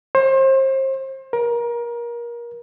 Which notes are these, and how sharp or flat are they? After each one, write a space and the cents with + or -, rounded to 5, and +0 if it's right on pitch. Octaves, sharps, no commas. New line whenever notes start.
C5 +35
A#4 +25